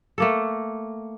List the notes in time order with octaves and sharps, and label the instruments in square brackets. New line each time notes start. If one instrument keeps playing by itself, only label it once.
[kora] A3 A#3 A4